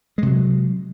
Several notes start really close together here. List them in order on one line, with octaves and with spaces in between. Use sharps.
G#3 C3 F#3